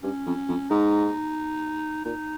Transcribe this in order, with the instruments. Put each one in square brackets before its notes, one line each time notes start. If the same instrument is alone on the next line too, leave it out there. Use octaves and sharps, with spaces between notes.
[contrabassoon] G2 [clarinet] C#4
[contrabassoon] F2
F2
[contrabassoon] G#2 [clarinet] D#4
[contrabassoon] A#2 [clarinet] D#4